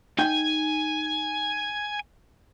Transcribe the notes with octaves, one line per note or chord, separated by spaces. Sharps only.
D#4 G5 G#5